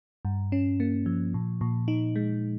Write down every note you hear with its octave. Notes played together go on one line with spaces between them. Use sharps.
G2
C#4
A#3
F3
A#2
A#2
D#4
G#3